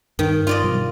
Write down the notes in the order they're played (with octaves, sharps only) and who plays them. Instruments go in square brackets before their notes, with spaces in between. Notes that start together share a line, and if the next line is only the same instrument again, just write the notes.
[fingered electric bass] G2 [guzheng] D#3
[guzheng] F4 D5 D#5
[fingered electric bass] B2 F#3 G3